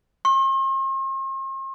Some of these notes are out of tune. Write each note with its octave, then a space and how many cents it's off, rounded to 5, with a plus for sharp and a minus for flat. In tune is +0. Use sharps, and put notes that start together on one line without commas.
C6 +45